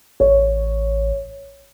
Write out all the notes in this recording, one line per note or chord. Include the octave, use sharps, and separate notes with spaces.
A1 C#5